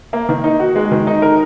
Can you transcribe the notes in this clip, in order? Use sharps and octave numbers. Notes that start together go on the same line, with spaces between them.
A#3
D#3
D#4
F#4
G#3
D#3
D#4
A#4